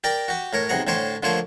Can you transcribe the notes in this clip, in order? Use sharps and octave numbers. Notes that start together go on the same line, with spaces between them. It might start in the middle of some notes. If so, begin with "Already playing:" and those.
G4 A#4 D5 G5
F#4 G4
A2 A#4 C#5
B1 C3 G#4 F#5 A#5
A2 D3 C5 C#5 G5
D3 F3 A3 A#3 C5 C#5